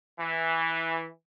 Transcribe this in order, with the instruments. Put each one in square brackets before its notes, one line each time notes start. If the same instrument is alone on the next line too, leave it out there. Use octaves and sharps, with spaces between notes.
[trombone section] E3